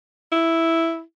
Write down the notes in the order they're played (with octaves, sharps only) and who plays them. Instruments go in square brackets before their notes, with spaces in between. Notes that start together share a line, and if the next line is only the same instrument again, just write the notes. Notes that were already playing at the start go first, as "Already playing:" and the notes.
[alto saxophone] E4